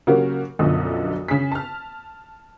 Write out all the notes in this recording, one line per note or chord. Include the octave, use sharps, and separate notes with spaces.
C#3 F#3 A#3 F#4 G4 A#4
B1 F#2 D3 F3 D#6
C#3 G#4 B6
A5 F6